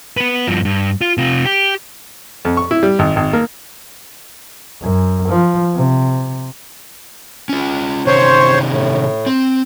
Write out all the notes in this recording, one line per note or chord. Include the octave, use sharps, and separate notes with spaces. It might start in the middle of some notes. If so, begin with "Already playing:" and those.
B3 B4
G2 F3
G2
F4
C3 F4
G4
F2
C#6
E4
G3
G#1
G#1
A#3
F#2
F3
C3
C#4 F4
C3 D#3 C#4 C5 C#5
A2
C4